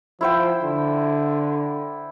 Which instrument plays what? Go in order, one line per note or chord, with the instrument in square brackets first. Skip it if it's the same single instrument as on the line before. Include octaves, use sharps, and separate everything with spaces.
[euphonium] F3 [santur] E4 C5 G5
[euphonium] D3